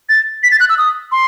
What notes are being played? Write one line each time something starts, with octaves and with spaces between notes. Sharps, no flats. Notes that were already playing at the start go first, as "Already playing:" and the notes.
A6
B6
A6
F#6
E6
D#6
C6